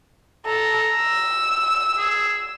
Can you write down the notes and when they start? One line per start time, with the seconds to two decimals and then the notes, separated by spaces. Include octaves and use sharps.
0.46 A4 A#5
0.95 E6
1.97 G#4